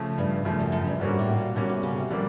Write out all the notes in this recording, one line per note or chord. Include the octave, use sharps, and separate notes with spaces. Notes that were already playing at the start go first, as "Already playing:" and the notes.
Already playing: C#3 F3 A3
G2
F#2 C#3 F3 A3
F#2
F#2
G2
G#2 D3 G3 A#3 C#4 F#4
A2
A#2
B2 D3 G3 A#3 C#4 F#4
C3
C#3
C3
D3 F3 G3 A#3